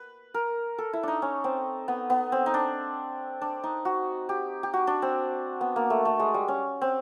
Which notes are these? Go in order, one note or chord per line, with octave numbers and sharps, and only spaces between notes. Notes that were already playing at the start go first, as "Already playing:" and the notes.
Already playing: B4
A#4
A4
E4
D4 D#4
C#4
C4
B3
B3
C4
D#4
D4
D4
D#4
F#4
G4
G4
F#4
D4
C4
B3
A#3
A3
A3
G#3
G3
C#4
C4